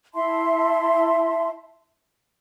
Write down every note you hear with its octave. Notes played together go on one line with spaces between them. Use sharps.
E4 E5 A5 C6